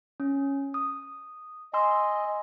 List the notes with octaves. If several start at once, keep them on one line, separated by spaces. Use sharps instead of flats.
C#4
D#6
D#5 G#5 C6 E6